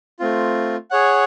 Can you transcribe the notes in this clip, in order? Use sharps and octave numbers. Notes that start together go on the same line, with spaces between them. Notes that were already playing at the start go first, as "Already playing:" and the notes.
A3 C4 F4
G#4 C#5 F#5